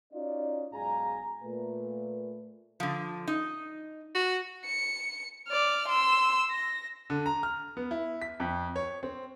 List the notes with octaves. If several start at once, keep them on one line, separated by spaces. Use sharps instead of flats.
C#4 D#4 F4 F#4 D5
B1 G#2 G#4 F5 G#5 A#5
A#2 A3 B4
D3 F3
D#4
F#4
C#7
D5 F6
C6 E6
A#6
D3
A#5
F6
B3
E4
B6
F2
C#5
C4